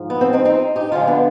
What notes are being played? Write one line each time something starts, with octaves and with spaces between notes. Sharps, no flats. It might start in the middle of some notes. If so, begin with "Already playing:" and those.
Already playing: G#2 F3
B3
C4
C4 D#4
C4 D#4
D#4 G4
D2 D3 F3 G#3 D4 F4
B3 D4